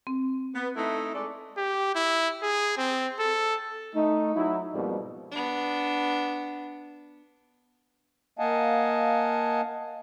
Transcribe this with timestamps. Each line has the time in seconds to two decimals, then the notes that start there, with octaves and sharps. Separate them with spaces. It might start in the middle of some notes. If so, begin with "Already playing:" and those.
0.07 C4
0.55 B3
0.75 A3 D#4 E4
1.13 G#3 A4 D5
1.57 G4
1.95 E4
2.42 G#4
2.78 C4
3.19 A4
3.94 A3 D#4
4.35 F#3 D#4 E4
4.73 F2 G#2 B2 G3 A#3
5.32 B3 D4
8.39 A#3 D#5 F5 F#5 G#5 A5